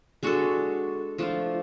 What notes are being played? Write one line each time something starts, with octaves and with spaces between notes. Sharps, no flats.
G#3 D4 F#4 A4
F3 A3 D4 F4